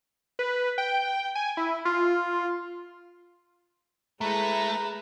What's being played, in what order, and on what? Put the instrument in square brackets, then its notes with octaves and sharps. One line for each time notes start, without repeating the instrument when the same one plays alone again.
[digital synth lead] B4
G5
G#5
E4
F4
[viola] G#3 [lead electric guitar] A3 [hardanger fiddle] E4 B4 [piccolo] A#5